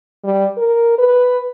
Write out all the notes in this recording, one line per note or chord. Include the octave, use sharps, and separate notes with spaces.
G3
A#4
B4